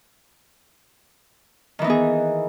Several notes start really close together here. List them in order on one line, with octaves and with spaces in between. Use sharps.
D#3 E3 D#4 B3 G#4